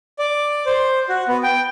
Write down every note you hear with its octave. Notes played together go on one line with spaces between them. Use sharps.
D5
C5
F#4
B3
G5